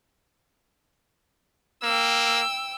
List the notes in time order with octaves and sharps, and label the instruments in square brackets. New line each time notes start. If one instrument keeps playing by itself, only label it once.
[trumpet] A#3 [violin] G5 E6